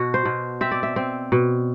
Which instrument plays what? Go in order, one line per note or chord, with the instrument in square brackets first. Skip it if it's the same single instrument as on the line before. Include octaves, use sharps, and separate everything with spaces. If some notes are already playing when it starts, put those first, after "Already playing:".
Already playing: [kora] B2 F#4
C5
B2
C4 E5
D5
E5
C4
B2